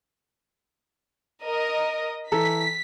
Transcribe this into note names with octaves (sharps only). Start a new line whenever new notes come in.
A#4 D#5
E3 A4 A#5 B6